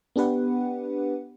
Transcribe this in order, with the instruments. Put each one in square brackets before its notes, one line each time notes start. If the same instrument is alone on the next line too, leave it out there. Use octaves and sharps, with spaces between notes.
[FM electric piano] B3 D4 G4 B4 F#5